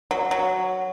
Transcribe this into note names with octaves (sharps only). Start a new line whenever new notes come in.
F#3
F#3